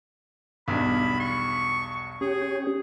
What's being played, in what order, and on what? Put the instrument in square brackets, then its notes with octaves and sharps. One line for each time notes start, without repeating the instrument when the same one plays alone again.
[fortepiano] B1 E2 G2 [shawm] B5
[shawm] C#6
[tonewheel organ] C#4 G4 [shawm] G#4